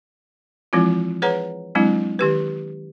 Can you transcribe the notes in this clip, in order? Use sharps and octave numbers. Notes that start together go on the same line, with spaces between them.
E3 F3 G#3 C4 E4 F4
G#4 B4 C#5 F#5 A#5
E3 F#3 G#3 C4 D4 E4
D#3 G4 B4